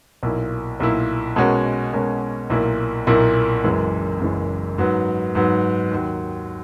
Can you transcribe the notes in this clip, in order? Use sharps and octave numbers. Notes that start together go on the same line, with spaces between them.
B1 A#2 A#3 E4
B1 A#2 A#3 E4
B2 G#3 C#4 F#4 A#4
B2 G#3 C#4 F#4 A#4
B1 A#2 A#3 E4 A#4
B1 A#2 A#3 E4 A#4
F#1 F#2 E3 G#3
F#1 F#2 E3 G#3
G#2 F#3 B3
G#2 F#3 B3
D#2 D#3 F#3